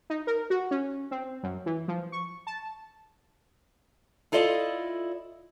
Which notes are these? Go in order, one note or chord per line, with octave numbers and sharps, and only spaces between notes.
D#4
A#4
F#4
C#4
C4
F#2
E3
F3
C#6
A5
E4 F4 A4 D5 D#5